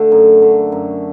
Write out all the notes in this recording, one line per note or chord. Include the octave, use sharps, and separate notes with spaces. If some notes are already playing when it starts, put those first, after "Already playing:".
Already playing: D3 A3
F#2
D3 A3
F#2